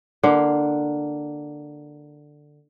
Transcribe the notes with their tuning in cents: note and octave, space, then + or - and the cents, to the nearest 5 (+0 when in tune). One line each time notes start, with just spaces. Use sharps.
D3 +10 A#3 +0 E4 +35